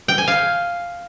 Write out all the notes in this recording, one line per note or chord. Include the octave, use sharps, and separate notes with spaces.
G5
G#5
F5